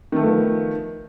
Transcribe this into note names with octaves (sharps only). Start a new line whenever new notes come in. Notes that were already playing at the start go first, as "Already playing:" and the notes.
D#3 F3 A3 B3